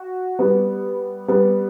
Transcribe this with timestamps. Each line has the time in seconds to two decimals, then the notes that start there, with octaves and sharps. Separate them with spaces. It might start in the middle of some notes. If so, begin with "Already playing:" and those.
Already playing: F#4
0.39 G3 B3
1.28 G3 B3